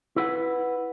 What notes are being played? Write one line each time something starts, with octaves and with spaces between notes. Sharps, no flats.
E4 B4 F#5